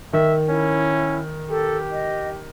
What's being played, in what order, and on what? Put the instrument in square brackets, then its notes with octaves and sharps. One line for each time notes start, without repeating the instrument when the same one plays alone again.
[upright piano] D#3 [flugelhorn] E5
[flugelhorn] C#4 [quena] E4
[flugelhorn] G4 [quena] A4
[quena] D#5